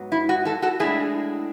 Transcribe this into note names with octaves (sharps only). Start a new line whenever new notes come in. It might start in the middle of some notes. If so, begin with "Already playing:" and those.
Already playing: G#2 F#3 B3
E4
F#4
F#4 A4
F#4 A4
A2 G#3 D4 E4 G#4